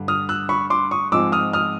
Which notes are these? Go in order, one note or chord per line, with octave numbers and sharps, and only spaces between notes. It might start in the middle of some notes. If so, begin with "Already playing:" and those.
Already playing: G2 D3
D#6 F6
E6 F#6
B5 C#6
C6 D6
C#6 D#6
G#2 F3 G#3 C4 D6 E6
D#6 F6
D#6 F6